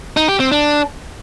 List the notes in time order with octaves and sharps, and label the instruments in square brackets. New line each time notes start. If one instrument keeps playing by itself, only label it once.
[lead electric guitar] D#4
G4
C4
D4